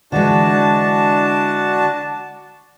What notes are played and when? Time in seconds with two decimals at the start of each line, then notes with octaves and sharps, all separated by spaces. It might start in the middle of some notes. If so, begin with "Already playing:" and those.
0.12 D3 E3 G#3 D4 F#4 A5